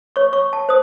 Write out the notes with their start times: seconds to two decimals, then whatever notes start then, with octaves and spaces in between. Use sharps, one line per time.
0.16 C#5 C#6
0.33 C#6
0.53 A5
0.69 C5 D#6